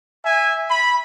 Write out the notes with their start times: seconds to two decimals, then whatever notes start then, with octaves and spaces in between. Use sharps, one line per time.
0.25 E5 G#5
0.71 B5